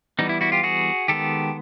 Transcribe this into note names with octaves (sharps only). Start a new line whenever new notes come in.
E3 G3 B3 D#4
E4
E4 F#4
F4 G4
F#4 G#4
D#3 G#3 B3 G4 A4